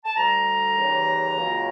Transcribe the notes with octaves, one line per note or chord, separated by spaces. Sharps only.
A5
D2 D3 G3 A#5
D#2 C#3 E3 G3
C#2 C#3 F#3 A#3